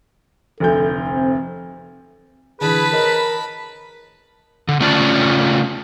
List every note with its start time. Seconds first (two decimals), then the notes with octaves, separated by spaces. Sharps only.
0.60 F1 D2 A4 G6
1.10 C4
2.61 D3 E3 G#4 B4 A5 B5
2.92 A#4 C#5 D#5
4.68 D3
4.80 C#3 A3 C#4 F4 D5 A5